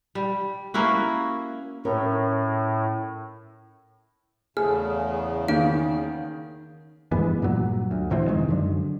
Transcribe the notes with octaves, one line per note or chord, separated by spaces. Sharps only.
G3
A#3 C#4 E4 F#4
A2 C#4 E4 A#4
E2 C#3 A3 G#4 F6
D#3 A#3 F5 D7
G2 E3 G#3 B3
G2 A#2 F#3
D2
D1 C3 E3 C4
F2 D#3 G#3
F#2 D3